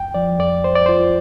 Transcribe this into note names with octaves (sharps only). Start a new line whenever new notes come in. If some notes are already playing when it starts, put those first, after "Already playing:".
Already playing: F2 G5
F3 D5
F2 D5
F2 C5
D5
F4 C5